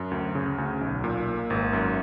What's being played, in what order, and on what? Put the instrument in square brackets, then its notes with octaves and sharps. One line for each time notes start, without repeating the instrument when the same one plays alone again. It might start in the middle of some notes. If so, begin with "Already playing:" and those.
Already playing: [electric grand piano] F#2
D2
C#3
D2
B1
A#2
A#3
G#1
F#2